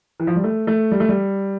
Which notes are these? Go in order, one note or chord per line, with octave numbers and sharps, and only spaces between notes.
E3
F3
G3
A3
A3
G3
A3
G3